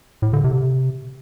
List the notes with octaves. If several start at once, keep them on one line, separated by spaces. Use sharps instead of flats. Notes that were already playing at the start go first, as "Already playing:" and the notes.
A2
D3
C3